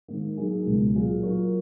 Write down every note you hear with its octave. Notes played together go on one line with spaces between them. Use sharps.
G#2 D#3 A#3 D#4
F#3 A#3 D#4 G#4
C#2 B2 G#3
A#2 F#3 A#3 F4 G#4
F#3 A#3 F4 A#4 C#5